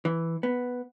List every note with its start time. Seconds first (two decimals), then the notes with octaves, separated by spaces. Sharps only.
0.05 E3
0.43 B3